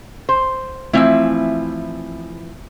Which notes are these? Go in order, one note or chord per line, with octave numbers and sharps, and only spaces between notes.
C5
E3 F3 A3 C4 E4 E5